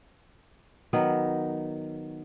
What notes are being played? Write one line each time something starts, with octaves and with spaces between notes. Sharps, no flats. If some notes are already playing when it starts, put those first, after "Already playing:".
D#3 F#3 B3